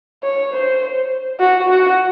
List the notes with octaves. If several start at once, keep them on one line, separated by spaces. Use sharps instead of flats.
C#5
C5
F#4
F#4